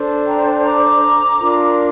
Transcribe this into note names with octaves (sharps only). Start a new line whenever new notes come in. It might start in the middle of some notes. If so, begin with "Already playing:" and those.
Already playing: D4 A4 C5
G5 A#5
A#5 D6
D4 F4 A#4